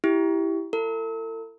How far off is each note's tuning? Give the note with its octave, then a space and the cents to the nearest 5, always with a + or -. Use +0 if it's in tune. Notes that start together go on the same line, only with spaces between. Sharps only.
E4 +0 G4 +0
E4 +35 A4 +40